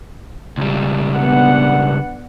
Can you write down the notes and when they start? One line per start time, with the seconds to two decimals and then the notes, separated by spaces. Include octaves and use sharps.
0.58 C#2 G3
1.15 B3 D4 F#5